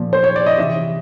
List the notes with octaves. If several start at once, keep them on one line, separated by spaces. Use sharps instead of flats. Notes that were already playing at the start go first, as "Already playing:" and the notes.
Already playing: A#2 F3
C5
C#5
D5
D#5
C3 E3 E5